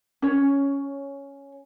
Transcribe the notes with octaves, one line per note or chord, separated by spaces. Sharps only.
C#4 C#5